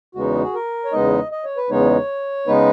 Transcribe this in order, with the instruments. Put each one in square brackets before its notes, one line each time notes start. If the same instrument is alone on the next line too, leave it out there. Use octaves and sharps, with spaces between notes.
[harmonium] E2 C#3 G#3 B3 D#4 F#4
G#4
A#4
C#5
E2 C#3 G#3 B3 D#4 D#5
D#5
C#5
B4
E2 C#3 G#3 B3 D#4 C#5
C#3 G#3 B3 D#4 B4